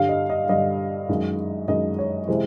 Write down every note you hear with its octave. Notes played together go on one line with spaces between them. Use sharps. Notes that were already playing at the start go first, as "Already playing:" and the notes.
Already playing: G2 D3 G3 F5
D#5
D#5
G2 D3 G3 D#5
F#2 D#3 G#3
F#2 D#3 G#3 D#5
C#5
C3 E3 G#3 C5